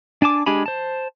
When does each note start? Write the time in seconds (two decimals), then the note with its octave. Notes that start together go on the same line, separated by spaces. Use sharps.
0.22 D4 G#5 A5 D6
0.46 G#3 D4 G4 G#5 B5
0.66 C5 A5